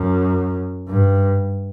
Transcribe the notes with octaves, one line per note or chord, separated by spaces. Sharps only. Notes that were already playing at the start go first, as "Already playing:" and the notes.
Already playing: F#2
G2